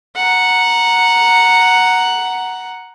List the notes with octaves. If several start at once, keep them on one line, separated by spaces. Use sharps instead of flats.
F#5 A#5